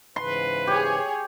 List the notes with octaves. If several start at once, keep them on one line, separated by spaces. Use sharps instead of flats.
G#2 C#3 E3 B4 C6
G4 G#4 C#5